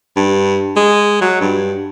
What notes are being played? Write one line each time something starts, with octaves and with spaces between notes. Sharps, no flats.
G2
G#3
F#3
G2